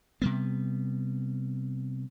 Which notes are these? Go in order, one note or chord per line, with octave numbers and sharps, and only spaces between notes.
C3 G3 B3